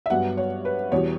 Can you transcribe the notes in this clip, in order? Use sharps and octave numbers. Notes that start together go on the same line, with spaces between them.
E5
G2 F#3 B3 F#5
C#5
B4
E2 B2 G3 C#5